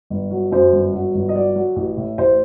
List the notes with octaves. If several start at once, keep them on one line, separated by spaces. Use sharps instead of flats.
G1
F#3
F#2 C5
G1
F#3
G1
D#5
F#3 D5
F#3
A1
A2
A1 C5